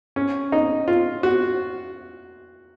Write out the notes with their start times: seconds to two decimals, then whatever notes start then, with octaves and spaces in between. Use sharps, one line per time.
0.16 C#4
0.52 D#4
0.88 F4
1.23 F#4